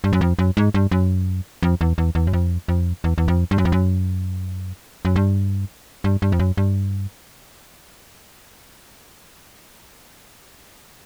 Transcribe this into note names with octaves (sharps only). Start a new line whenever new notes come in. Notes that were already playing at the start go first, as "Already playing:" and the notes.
G2
F#2
F2
F#2
G#2
G2
F#2
F2
E2
E2
E2
F#2
F2
F2
E2
E2
F2
G2
F#2
F2
F#2
F#2
G2
G2
G2
F2
F#2
G2